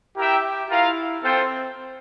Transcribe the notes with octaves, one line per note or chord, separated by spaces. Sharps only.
E4 G4 A#4 E5 G5
E4 F4 A#4 F5
C4 F4 A4 C5 G5